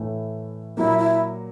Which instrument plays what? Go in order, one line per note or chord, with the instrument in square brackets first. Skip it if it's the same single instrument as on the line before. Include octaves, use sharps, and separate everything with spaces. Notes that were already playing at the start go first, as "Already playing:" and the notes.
Already playing: [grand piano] A2 E3 A3
[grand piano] A#2 F#3 A#3 [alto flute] E4
[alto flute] E4